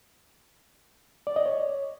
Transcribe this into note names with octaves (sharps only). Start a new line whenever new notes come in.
D5
D#5
C#5